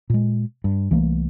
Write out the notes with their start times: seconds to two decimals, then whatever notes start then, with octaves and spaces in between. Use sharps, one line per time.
0.10 A#2 G#3
0.64 G2
0.91 C2 E3 A3 A#3